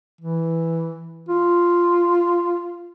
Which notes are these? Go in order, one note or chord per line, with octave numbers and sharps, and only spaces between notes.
E3
F4